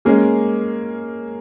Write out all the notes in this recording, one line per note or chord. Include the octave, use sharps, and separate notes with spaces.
G#3 A#3 C#4 G#4